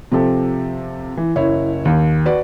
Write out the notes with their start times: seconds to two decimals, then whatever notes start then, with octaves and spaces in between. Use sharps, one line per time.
0.12 C3 F3 G4 A4
1.17 E3
1.36 F#1 E4 C#5
1.85 D#2
2.26 F#4 B4 D5